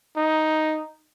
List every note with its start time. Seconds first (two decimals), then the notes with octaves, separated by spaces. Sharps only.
0.17 D#4